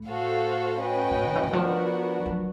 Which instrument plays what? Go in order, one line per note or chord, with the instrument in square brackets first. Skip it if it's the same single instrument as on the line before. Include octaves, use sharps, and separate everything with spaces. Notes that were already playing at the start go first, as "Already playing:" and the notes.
Already playing: [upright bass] A2
[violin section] F#4 A4 C5 F5
C#4 F#4 B4 D#5 G5
[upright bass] A#2
A2
D#3
E3
D3
[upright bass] F3 [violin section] B3 D4 F#4 A#4
[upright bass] F#3